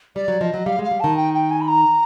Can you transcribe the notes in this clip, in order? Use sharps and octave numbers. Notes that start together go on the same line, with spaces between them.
G3 D5
F#3
F3 D#5
F#3
G3 F5
G#3
F5
G3
D#3 A5
G5
G5
G#5
B5
A#5